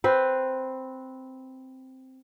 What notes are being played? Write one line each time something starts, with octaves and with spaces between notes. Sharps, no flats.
C4 B4